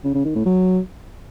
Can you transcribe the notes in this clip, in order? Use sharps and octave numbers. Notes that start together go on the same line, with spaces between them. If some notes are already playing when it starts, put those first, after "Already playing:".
C#3
C#3
D#3
A2
F#3